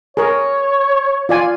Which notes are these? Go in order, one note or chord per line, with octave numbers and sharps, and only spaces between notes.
G#4 A#4 C#5
F4 D5 G#5